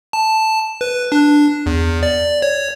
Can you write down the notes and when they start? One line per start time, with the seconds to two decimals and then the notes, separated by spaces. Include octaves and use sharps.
0.13 A5
0.81 B4
1.12 D4
1.66 E2
2.03 D5
2.42 C#5